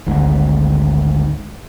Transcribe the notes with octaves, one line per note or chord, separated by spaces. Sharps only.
G#1 D2 G#2